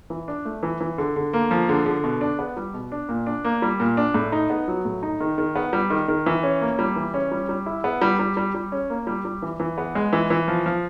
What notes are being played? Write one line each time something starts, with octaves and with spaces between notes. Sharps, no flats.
E3
D4
A3
E3
E3
D3
D3
A#3
F3
D3
D3
B2
D4
B3
G3
B2
D4
A#2
D4
A#3
G3
A#2
D4
A2
D#4
B3
F#3
A2
D#4
D#3
D#3
B3
G3
D#3
D#3
E3
C#4
A#3
G3
E3
C#4
G3
G3
E4
B3
G3
G3
G3
G3
C#4
A#3
G3
G3
E3
E3
B3
G#3
E3
E3
F3
F3